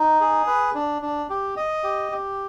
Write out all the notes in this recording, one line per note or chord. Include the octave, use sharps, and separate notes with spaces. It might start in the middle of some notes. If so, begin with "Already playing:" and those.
Already playing: D#4
G#4
B4
D4
D4
G4
D#5
G4
G4